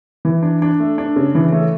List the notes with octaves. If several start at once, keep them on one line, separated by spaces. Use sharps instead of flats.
E3
D4
D4
A3
D4
C#3
E3
A3